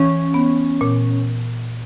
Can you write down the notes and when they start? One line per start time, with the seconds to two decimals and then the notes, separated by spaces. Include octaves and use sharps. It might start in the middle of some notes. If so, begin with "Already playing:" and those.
Already playing: E3 C#4
0.34 B3
0.81 A#2